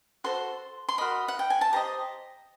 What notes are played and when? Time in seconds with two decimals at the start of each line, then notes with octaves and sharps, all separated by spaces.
0.24 F#4 A4 C5 C6
0.89 C6
0.98 F#4 A#4 D#5 B5
1.28 F#5
1.39 G5
1.50 G#5
1.61 A5
1.73 G4 C5 D#5 A#5